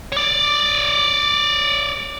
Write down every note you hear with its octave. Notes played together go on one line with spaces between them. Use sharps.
C#5 D5